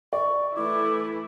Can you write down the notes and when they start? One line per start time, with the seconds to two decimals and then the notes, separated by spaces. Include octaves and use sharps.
0.13 D5 C#6
0.55 E3 A3 E4 D6